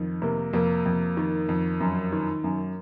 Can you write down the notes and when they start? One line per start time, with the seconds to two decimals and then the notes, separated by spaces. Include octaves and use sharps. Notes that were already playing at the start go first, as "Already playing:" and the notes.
Already playing: F2 D#3
0.22 C3 A#3
0.53 F2 A#3
0.86 F2
1.17 D#3
1.49 F2
1.80 F#2
2.12 D#3
2.44 F#2